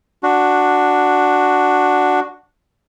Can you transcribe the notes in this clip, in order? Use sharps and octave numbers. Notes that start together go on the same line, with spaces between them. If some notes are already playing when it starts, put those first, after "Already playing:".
D4 F#4